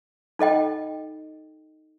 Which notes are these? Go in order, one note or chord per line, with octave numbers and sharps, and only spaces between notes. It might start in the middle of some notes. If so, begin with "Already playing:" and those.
D#4 A4 D#5 G5